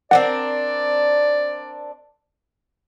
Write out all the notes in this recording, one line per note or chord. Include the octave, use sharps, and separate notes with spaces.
C4 D4 A#4 D5 F#5